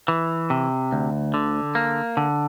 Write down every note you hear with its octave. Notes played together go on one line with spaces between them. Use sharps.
E3
C3
D2
D3
A#3
D3